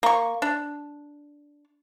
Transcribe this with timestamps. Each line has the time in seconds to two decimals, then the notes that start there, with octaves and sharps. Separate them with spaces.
0.03 A#3 C#6
0.42 D4